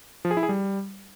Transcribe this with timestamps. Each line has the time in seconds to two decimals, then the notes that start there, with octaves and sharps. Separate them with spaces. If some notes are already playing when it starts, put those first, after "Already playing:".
0.25 F3
0.31 G#4
0.37 E4
0.43 G#4
0.49 G3